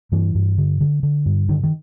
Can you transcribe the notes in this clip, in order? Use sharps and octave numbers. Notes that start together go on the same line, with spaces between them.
G2 E3
G2
D3
D3
D3
G2
D3 D#3
D#3